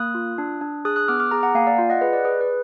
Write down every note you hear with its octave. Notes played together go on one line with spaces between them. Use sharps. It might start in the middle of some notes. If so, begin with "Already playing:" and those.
Already playing: A#3 D#6 F#6
F4
D4
D4
G#4 D#6 F#6
D#6 F#6
B3 D6 F6
D6 F6
G#4 A#5 D6
F#5 A#5
A#3 F5 G#5
D5 F5
F4
D#5 F#5
G#4 B4 D#5
D5
G#4 B4
B4